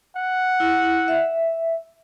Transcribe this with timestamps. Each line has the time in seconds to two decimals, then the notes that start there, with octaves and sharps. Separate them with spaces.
0.17 F#5
0.60 E4
1.08 E5